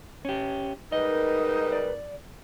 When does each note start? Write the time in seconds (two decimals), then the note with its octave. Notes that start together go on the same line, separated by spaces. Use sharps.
0.25 C#4 G4
0.92 G#2 G3 D#4 A#4 B4 D#5
1.72 D5